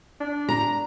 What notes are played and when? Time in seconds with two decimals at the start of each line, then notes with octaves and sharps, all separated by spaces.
0.20 D4
0.49 A#5